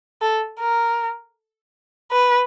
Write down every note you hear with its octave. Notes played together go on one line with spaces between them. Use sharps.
A4
A#4
B4